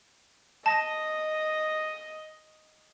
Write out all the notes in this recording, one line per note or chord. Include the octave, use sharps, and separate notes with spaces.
D#5 A5 A#6